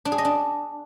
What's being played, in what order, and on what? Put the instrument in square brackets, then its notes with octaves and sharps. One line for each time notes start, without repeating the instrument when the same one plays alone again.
[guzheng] D4
G#4
D#5
D4